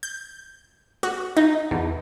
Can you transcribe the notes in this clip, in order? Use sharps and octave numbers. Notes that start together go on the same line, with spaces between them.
G6
F#4
D#4
E2